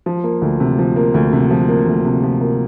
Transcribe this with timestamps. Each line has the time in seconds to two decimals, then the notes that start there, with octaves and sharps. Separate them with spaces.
0.06 F3
0.24 A#3
0.42 D2
0.60 C3
0.79 F3
0.96 A#3
1.14 D2
1.33 C3
1.51 F3
1.69 A#3
1.87 D2
2.05 C3
2.23 F3
2.41 A#3